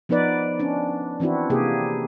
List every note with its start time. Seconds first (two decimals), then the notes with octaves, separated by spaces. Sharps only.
0.09 F3 B3 D#4 B4 D5
0.60 C#4 D4
1.20 E3 C4 D4 E4 F#4
1.50 C3 A#3 G4 G#4